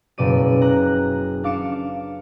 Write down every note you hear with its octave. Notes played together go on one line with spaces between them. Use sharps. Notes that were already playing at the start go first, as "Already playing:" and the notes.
F#1 B2 D5 D#7
A#5 F#6
D4 F5 D6 C#7 D7 E7